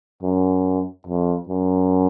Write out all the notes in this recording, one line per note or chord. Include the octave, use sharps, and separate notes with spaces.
F#2
F2
F#2